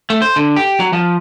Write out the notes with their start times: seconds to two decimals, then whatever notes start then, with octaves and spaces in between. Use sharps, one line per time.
0.10 A3
0.22 C5
0.36 D3
0.56 G4
0.80 F#3
0.93 F3